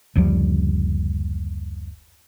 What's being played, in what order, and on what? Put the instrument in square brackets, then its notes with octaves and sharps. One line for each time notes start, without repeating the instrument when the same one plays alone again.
[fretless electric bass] F#1 D2 F3 G3